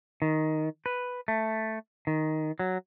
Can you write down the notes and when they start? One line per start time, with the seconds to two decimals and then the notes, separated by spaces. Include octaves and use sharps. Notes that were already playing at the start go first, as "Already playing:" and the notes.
0.22 D#3
0.86 B4
1.28 A3
2.07 D#3
2.59 F#3